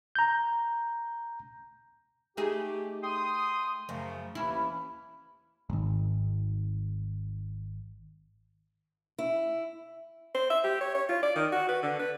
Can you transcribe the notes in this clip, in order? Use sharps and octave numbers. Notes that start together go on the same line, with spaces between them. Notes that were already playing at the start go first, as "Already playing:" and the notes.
A#5 G6
A3 D#4 G4 G#4
G5 C6 D#6
F#2 C#3 F3 A3
D#2 E3 C#4 E4
D1 G#1
E4
C5
E5
G4
C#5
C#5
F4
D5
D#3
F#4
B4
D3
B4